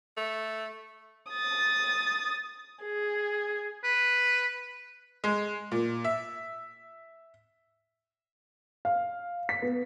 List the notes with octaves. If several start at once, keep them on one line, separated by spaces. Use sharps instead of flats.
A3
D#6 A6
G#4
B4
G#3
A#2
E5
F5
B6
B3